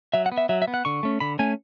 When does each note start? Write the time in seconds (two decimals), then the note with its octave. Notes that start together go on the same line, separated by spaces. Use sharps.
0.14 F#3 E5
0.26 F#5
0.32 B3
0.38 E5
0.49 F#3 E5
0.62 E5
0.68 B3
0.74 F#5
0.85 D3 C#6
1.03 A3 C#4
1.20 D3 B5
1.39 A3 C#4 G#5